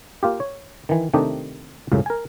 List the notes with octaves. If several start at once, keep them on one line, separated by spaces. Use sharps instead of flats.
A#3 F4 G4
C#5
D#3 E3
C3 D#3 A3 D4 D#4 G4
C#2 F#2 A2 C#3
A#4 G#5